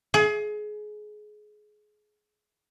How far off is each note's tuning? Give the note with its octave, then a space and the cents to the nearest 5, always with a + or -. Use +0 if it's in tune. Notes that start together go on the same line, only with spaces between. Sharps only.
G#4 +25